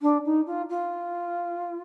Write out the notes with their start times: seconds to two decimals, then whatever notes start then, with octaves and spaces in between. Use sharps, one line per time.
0.02 D4
0.25 D#4
0.46 F4
0.69 F4